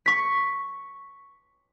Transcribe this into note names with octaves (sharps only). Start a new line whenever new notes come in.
C#6 B6